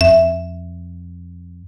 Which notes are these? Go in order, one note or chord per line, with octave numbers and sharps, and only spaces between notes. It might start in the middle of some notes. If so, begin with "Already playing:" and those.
F2 E5